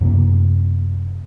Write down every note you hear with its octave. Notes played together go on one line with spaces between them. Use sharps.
F#2 C3 A#3